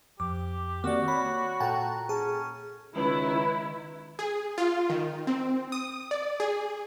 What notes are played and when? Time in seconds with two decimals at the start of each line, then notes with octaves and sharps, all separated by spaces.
0.20 F2 G4 D6
0.84 D#3 A#3 C4 F#4 G4 D5
1.08 C#5 B5
1.60 A#2 A4 F#5 G5 A5 A#5
2.09 C#4 G#4 A5
2.95 C#2 D#3 E4 B4
4.19 G#4
4.58 F4
4.90 D#3
5.27 C4
5.72 D#6
6.11 D5
6.40 G#4